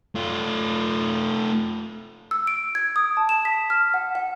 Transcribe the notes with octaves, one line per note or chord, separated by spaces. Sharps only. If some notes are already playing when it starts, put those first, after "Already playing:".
A3 F4
E6
D7
G#6
D#6
A5
E7
B6
F6
F#5
F#5